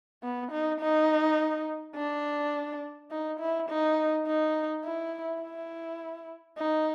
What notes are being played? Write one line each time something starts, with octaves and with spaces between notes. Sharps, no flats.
B3
D#4
D#4
D4
D#4
E4
D#4
D#4
E4
E4
D#4